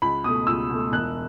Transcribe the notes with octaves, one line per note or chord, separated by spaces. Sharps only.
C#2 B5
B2 A3 D#6
C#2 E6
B2 A3
E1 F#6